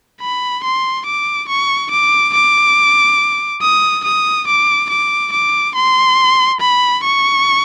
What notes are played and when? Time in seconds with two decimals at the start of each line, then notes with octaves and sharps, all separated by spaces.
0.21 B5
0.63 C6
1.06 D6
1.49 C#6
1.91 D6
2.34 D6
3.62 D#6
4.04 D#6
4.47 D6
4.90 D6
5.33 D6
5.75 C6
6.60 B5
7.03 C#6